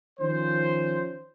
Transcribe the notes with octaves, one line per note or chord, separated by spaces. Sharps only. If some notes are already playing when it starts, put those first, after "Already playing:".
D#3 F3 C#4 C5